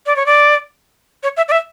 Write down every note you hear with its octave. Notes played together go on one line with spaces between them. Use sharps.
D5
C#5
D5
C#5
E5
D5
E5